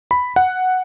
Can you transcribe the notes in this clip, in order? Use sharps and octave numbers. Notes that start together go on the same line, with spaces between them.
B5
F#5